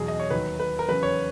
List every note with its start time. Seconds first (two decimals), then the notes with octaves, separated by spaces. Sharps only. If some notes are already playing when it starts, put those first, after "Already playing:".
Already playing: E2 B2 F#3 G#4
0.08 D#5
0.20 C#5
0.31 D#2 D#3 F#3 B4
0.60 B4
0.79 A#4
0.89 E2 C#3 F#3 B4
1.03 C#5